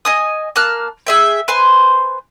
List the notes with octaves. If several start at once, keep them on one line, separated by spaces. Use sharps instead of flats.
D#5 G#5 D#6
A#3 A5 F6 F#6
G#4 E5 G5
B4 C5 G#5 C6